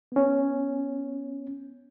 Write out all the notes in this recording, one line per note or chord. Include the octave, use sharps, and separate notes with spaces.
B3 C#4